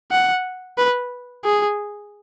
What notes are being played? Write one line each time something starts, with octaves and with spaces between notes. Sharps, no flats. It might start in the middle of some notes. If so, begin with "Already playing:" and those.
F#5
B4
G#4